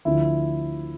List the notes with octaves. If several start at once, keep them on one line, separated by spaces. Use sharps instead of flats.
D2 D3 F3 E4